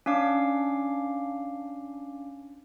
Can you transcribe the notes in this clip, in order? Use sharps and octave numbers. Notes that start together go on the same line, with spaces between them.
C#4 D4 F5 D6